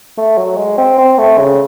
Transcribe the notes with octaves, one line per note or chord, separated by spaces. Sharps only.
A3
F#3
G#3
C4
C4
A3
C#3